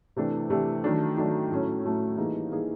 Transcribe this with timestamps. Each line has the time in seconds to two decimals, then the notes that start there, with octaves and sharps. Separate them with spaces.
0.16 C3 E3 A3 D4 G4
0.50 C3 E3 A3 D4 G4
0.84 D#3 F#3 A3 D4
1.17 D#3 F#3 A3 D4
1.51 A2 F#3 A3 C#4
1.84 A2 F#3 A3 C#4
2.17 E3 G3 A#3 D#4 G#4
2.51 E3 G3 A#3 D#4 G#4